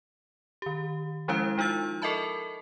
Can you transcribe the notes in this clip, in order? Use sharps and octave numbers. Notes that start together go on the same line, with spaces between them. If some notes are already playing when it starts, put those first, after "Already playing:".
D#3 G4
F3 G#3 C#4 E4 C5 F5
F3 D#4 F4 E6 A6
A4 A#4 D#5 E5 A5 B5